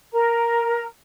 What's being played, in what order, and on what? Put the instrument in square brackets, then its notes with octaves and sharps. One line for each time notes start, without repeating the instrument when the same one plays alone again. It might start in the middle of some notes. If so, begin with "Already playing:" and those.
[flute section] A#4 A#5